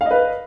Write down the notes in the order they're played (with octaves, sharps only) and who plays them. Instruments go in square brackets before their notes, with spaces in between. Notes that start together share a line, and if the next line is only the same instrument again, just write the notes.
[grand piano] F5
D#5
B4